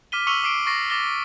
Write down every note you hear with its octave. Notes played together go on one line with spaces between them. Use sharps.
D6 F6 B6 D#7 G7
C#6 E6 C#7 D#7 F7 G7
D6 C7 D7 G7
C#6 A6 A#6 C7
D6 A6 A#6 G7